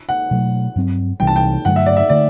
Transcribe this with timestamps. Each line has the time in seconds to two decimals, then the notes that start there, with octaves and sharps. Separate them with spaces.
0.09 F#5
0.31 B2 F#3 A3
0.76 G2 F#3 C4
1.20 C2 C3 E3 G3 G5
1.27 A5
1.36 G5
1.65 G2 D3 F#3 A3 F#5
1.76 E5
1.86 D5
1.97 E5
2.09 D3 A3 D5